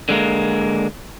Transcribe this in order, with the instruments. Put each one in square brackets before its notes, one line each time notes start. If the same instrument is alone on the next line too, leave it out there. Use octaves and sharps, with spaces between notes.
[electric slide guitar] D3 G#3 A#3